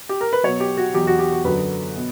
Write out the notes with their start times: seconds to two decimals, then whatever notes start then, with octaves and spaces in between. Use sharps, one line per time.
0.09 G4
0.21 A#4
0.33 B4
0.43 B2 F#3 C#5
0.60 G4
0.77 F#4
0.94 E2 B2 F#3 G4
1.07 F#4
1.19 G4
1.32 F#4
1.44 F#2 D3 F#3 B4
1.96 B2